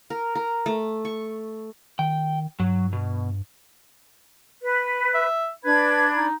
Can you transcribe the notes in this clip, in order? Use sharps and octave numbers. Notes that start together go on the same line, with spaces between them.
A#4
A#4
A3
C#6
D#3 G5
G2 F#3
B2
B4
E5
D4 B4 B5 G#6
D#4